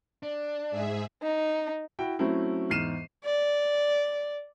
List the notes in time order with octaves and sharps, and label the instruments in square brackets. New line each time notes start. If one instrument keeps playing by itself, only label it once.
[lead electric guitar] D4
[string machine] G#2 G#4 E5
[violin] D#4
[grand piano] E4 F#4 G5 B5
F#3 A3 C4 C#4 E4
E2 G#2 F6 C7 D#7 E7
[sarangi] D5